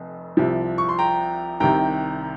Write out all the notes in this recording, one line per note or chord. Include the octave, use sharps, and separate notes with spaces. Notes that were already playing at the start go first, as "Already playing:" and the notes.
Already playing: F1 F2
C2 C3 F3
C#6
C6
G5 A#5
C2 C3 D#3 G5 A#5